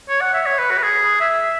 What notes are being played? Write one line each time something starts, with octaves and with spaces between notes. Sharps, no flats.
C#5
F#5
E5
C#5
B4
F#4
B4
G#4
E5